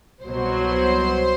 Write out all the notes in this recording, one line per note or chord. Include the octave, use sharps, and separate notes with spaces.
C2 B2 F#3 C5